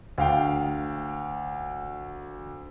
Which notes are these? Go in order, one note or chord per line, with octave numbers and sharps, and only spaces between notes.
D2 F5 G5